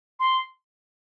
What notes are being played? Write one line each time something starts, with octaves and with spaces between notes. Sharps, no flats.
C6